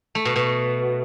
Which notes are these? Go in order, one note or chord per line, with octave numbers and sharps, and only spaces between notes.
A3
B2
B2